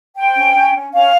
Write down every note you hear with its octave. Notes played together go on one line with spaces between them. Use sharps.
C5 G5
C#4
C#4
C#4
C#4 F5